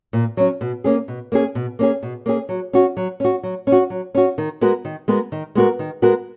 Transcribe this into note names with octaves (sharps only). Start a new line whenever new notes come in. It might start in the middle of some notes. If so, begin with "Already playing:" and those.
A#2
F#3 C#4
B2
A#3 C#4 G#4
B2
A#3 C#4 G#4
B2
A#3 C#4 G#4
B2
A#3 C#4 G#4
F#3
C#4 F#4
F#3
C#4 F#4
F#3
C#4
F#4
F#3
C#4 F#4
D#3
G#3 B3 F#4 A#4
D#3
G#3 B3 F#4 A#4
D#3
G#3 B3 F#4 A#4
D#3
G#3 B3 F#4 A#4